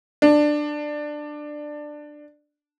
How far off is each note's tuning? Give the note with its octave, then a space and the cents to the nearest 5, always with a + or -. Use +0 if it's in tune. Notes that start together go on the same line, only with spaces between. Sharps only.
D4 +15